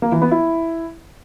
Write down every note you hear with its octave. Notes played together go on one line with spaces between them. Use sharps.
A#3
E3
B3
E4